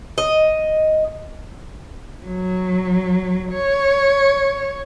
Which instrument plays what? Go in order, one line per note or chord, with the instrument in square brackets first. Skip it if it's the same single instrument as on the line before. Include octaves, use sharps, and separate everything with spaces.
[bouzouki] D#5
[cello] F#3
C#5